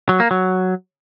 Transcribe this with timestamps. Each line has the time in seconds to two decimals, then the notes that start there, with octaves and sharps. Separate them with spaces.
0.09 F#3
0.20 A#3
0.31 F#3